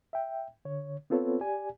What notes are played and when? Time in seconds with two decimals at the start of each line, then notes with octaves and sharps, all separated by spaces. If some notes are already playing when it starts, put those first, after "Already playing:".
0.13 E5 G5
0.65 D3 C#5
1.10 B3 C4 F4 A4 B4 C#5
1.40 G4 D5 G#5